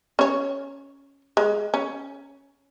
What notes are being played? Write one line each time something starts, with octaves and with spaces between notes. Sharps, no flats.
C#4 C#5
G#3
C#4